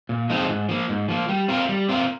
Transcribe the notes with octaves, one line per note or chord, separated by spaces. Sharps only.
A#2
F3 G#3 C4 D#4
G#2
F3 A#3
G#2
F3 A#3
G3
C4 F4 A#4
G3
C4 F4 A#4